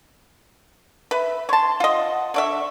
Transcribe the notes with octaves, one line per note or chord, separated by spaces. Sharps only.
B4 E5
C#5 A5 C6
F4 D#5 F#5
D3 D5 E5 C#6